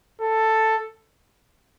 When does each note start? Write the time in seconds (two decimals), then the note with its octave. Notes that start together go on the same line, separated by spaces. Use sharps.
0.21 A4